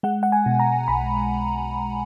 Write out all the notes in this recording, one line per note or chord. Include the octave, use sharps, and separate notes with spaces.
G#3 F#5
F#5
G#5
B2
A#5
B1 B5